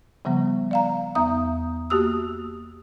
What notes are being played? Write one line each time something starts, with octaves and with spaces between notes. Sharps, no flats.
C#3 F3 G3 B3
D5 F5 A#5
E2 B3 E5 A#5 D#6
A#3 F#4 G4 D#6 E6